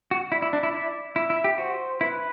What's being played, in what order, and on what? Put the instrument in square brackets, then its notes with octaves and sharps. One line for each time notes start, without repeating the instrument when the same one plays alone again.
[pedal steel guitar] F#4
[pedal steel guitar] E4 [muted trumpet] D5
[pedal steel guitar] E4
D4
E4
E4
[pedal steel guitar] E4 [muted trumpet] E5
[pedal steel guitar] E4
G4
[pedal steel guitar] F#4 [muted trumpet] C5
[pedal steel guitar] E4 [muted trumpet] B4